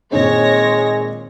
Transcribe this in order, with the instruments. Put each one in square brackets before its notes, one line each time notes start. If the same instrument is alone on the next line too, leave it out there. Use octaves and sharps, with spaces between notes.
[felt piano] A#2 D#3 C4 [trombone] G#3 [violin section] C#5 A#6